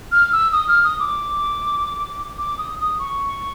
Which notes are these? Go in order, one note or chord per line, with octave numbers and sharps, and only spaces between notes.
F6
E6
D#6
F6
D#6
D6
D6
D#6
D#6
C#6